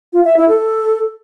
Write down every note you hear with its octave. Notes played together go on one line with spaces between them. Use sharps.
F4
E5
E4
A4